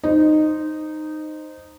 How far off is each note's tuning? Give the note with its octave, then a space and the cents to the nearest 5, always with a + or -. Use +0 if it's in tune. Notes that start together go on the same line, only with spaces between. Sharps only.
D#4 -10 C5 +0